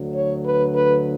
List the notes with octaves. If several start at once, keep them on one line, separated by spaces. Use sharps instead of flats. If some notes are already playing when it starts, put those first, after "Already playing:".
Already playing: D2 D3 F#3
C#5
B4
B4